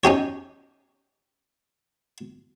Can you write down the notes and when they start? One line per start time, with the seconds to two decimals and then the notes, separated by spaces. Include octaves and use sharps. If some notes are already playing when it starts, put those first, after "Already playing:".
0.04 C#4 D#4 G4 C#5